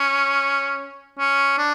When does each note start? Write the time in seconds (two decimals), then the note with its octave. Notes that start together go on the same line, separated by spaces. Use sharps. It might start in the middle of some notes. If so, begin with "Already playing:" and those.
Already playing: C#4
1.19 C#4
1.58 D4